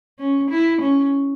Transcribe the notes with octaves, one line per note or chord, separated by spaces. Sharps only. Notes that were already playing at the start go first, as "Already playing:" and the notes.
C#4
E4
C#4